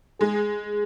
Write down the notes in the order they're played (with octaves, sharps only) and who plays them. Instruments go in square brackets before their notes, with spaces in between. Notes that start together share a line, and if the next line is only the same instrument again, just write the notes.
[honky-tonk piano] G#3 [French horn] G#4